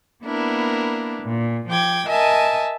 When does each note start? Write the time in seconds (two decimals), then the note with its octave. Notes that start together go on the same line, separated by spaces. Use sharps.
0.24 A#3 B3 D4 E4 A#4
1.23 A#2
1.68 F3 G5 D6 G#6
2.07 A#4 D#5 E5 G#5 A5